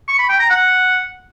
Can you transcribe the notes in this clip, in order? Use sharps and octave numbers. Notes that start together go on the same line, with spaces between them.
C#6
B5
G5
A#5
F#5